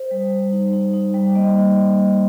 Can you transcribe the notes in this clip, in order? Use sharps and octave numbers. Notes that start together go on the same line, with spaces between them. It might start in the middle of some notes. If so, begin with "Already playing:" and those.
Already playing: C5
G3
G3
D#4
D#4
D#4
G3
A#3 D#5
D#4
A#3
D#4